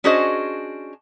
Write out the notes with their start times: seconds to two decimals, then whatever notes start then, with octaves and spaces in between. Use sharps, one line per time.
0.04 C#4 D4 F#4 G#4 C5 D#5